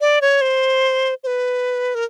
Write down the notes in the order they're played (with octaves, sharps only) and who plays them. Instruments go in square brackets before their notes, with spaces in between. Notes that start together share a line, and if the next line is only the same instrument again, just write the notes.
[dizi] D5
C#5
C5
C5
B4
A#4